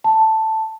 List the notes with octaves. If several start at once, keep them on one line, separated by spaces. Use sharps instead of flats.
A5